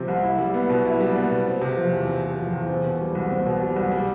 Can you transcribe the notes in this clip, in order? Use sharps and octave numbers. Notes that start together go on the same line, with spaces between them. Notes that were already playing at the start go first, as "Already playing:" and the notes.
Already playing: C3 F3 C4
C2
E4
G3
B3
B2
E4
G3
B3
B2
C4
C3
F3
E2
C4
C3
F3
E2
C4
B2
G3
C2
C4
B2
G3
C2
G3